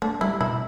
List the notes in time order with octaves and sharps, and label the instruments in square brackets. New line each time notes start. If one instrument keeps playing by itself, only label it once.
[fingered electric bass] A3 [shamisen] D4
[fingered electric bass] G3 [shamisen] E4
[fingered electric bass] B2 [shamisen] E4